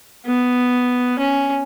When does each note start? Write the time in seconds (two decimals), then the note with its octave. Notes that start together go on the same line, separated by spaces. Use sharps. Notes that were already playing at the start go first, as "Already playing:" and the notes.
0.26 B3
1.19 C#4